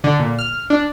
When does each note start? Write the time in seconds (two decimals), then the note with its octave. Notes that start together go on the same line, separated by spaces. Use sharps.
0.04 D3
0.19 A#2
0.39 F6
0.70 D4